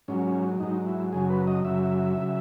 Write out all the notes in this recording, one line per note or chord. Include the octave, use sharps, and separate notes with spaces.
G#2 F#3 C#4
G#2 F#3 D#4
E4
F#2 C#3 F#3 G#4
B4
D#5
F#2 C#3 F#3 E5
C#3 F#3